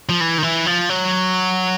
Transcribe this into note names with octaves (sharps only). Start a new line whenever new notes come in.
F3
E3
D#3
E3
F3
F#3